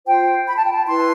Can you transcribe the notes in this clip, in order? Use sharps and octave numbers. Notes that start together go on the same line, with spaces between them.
F4 C5 G5
B5
A5
G5
A5
E4 B4 C6